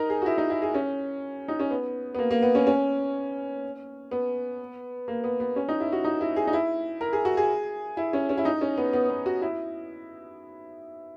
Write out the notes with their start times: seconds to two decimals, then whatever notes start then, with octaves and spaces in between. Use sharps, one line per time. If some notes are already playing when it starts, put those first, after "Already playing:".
Already playing: D#4 A#4
0.10 G#4
0.22 F#4
0.26 E4
0.38 D#4
0.50 E4
0.62 G#4
0.74 C#4
1.48 D#4
1.60 C#4
1.71 B3
2.15 B3
2.19 A#3
2.31 A#3
2.42 B3
2.55 C#4
2.67 C#4
4.11 B3
5.08 A#3
5.24 B3
5.40 B3
5.56 C#4
5.68 D#4
5.80 E4
5.92 F#4
6.04 D#4
6.21 E4
6.36 G#4
6.47 D#4
6.53 E4
7.01 A#4
7.13 G#4
7.25 F#4
7.37 G#4
7.97 E4
8.13 C#4
8.29 C#4
8.37 E4
8.45 D#4
8.61 C#4
8.78 B3
8.93 B3
9.10 B3
9.26 F#4
9.42 E4